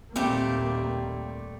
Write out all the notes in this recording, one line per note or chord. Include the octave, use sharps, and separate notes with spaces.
D#2 A#2 G3 A3 A#3 C4 G4